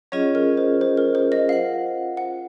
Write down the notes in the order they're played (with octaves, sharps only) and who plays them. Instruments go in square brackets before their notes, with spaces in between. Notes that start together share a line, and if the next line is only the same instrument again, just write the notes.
[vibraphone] F#3 C#4 F4 G#4 D#5 [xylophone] C#5
[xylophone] A#4
C5
C5
A#4
C5
D#5
[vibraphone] F4 C5 F#5 [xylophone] F5
[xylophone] F#5